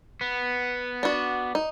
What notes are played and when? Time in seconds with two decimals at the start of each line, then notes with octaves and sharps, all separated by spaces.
0.21 B3
1.03 D4 F#4
1.55 D#4